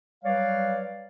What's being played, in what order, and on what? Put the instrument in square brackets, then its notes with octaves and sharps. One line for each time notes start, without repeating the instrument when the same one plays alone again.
[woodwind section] F#3 G3 B4 C#5 D5 F5